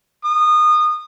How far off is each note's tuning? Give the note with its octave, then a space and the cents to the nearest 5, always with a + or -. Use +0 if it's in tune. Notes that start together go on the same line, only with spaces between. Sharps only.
D#6 -25